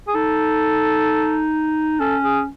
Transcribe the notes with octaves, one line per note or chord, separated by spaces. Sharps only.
G#4
D#4 A4
C#4 A4
G#4